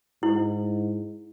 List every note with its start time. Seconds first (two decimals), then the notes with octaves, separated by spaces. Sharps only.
0.23 G#2 E4